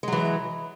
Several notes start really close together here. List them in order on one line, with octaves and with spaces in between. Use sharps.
G#3 F#3 E3